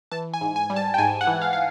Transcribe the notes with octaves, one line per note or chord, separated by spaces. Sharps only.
E3 A5
G#5
G#2
G#5
G3
A5
G5
G#2 G#5
F#5
E3
F5
F5